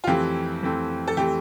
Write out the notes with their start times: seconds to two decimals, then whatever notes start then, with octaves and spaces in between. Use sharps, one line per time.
0.04 F4
0.07 F2 E3 A3 C4 G4
0.62 F2 E3 A3 C4
1.07 A4
1.17 E3 A3 C4 G4